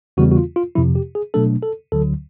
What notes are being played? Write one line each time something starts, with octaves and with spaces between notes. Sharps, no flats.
E2 C#3 E3 G3 B3 F#4
F#4
F4
F4
F2 C3 F3 E4
G4
G#4
B2 F#3 A3 D4 A4
A4
D2 D3 F#3 A4